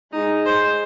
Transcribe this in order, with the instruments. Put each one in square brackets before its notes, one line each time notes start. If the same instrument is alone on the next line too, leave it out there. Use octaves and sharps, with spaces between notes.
[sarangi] G#3 [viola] D#4
[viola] C5